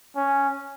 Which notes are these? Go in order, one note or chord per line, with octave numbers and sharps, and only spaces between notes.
C#4